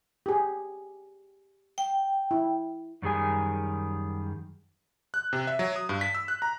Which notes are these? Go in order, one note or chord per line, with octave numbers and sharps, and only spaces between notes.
G4 G#4
G5
E4
F#2 D#3 G3 G#4 G#5
F#6
C3
E5
F#3
D#6
G2
B6
E6
F#6
A#5